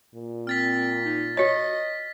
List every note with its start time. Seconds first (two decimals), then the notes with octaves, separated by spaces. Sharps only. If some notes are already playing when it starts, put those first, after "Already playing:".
0.15 A#2
0.47 C4 F6 A6 B6
1.05 D#4
1.37 F#4 C#5 D#5 B6